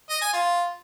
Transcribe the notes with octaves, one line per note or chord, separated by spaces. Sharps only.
D#5
G#5
F4